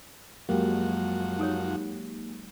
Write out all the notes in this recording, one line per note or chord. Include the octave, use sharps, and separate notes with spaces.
F#2 F3 F#3 G#3 A#3 F#4 G4
D#4 A4 C#5